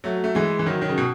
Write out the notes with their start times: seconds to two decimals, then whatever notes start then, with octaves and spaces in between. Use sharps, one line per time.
0.04 F#3 A3
0.24 A3
0.35 E3 G#3
0.59 E3
0.66 D#3 F#3
0.81 D#3 F#3
0.89 C#3
0.98 B2